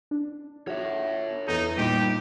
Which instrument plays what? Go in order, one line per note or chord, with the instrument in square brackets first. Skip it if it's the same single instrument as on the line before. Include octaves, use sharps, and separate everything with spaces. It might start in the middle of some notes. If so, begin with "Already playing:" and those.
[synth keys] D4
[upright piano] F#4 [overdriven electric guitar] C#5 E5
[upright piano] E2 A4 [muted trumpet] D#4
[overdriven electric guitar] G2 [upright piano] A#2 D#4 [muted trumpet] G4